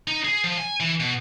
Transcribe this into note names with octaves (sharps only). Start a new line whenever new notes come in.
D#4
G#4
F3
G#5
E3
B2